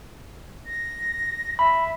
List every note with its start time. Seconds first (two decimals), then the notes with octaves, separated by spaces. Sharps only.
0.66 A#6
1.59 E5 B5